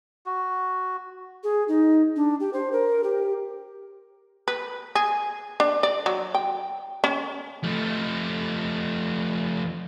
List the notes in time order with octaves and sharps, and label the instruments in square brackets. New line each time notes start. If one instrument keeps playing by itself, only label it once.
[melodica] F#4
[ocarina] G#4
D#4
D4
G4
C5
A#4
G4
[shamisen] B4
G#4
D4
D5
F#3
G5
C#4
[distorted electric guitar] F3 A3